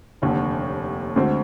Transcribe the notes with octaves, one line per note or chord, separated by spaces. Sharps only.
F1 D#2 D3
D2 D3 G#3 C4